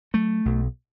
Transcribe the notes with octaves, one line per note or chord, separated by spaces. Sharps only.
F#3 A3
B1 B2